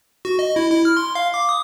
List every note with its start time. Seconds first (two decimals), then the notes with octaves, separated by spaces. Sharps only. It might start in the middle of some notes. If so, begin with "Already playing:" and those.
0.25 F#4
0.39 D#5
0.56 E4
0.71 E4
0.85 F6
0.97 C6
1.15 F5
1.34 D6
1.49 D#6